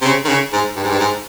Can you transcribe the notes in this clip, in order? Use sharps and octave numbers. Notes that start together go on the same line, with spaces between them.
C3
C#3
D#3
C#3
G#2
G2
G#2
G2
G#2